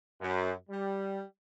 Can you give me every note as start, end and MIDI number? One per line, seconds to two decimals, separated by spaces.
0.21 0.52 42
0.70 1.22 55